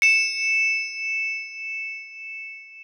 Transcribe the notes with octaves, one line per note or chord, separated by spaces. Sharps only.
C#7 E7